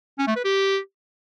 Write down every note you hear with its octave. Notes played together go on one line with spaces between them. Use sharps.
C#4
A3
B4
G4